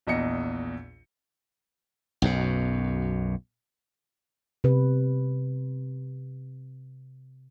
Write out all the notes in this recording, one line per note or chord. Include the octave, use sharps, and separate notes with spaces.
A#1 E2 D#5 C#7
B1 F#2 B2
C3 B4